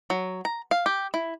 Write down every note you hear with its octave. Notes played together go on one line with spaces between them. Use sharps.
F#3
A#5
F5
G4
E4